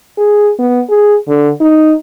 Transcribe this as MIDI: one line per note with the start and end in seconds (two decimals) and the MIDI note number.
0.17 0.51 68
0.59 0.81 59
0.89 1.15 68
1.28 1.50 50
1.60 1.94 63